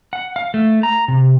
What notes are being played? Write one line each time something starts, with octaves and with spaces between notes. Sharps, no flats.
F#5
F5
A3
A#5
C3